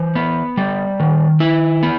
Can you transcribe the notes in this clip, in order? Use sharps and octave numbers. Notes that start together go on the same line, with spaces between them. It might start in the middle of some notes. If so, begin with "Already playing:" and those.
Already playing: E3 C5
B3
G3
D#3
E4
B3